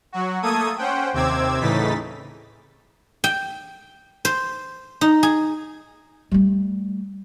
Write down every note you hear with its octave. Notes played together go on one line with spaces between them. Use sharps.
F#3 F#4
A3 A#3 A4 D#6 G#6 D#7
C#4 C5 F#5 G5
D#2 C3 C4 D6 E6 G#6
A2 C#3 E3 D#4 A6 B6
G5
C5
D#4
G#4
G3 A3